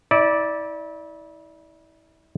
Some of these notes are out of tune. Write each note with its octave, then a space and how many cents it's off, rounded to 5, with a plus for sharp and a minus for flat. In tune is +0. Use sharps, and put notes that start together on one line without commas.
E4 -35 D5 -5